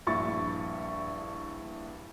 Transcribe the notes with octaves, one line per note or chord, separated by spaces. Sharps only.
A#1 G2 E4 C#6 A6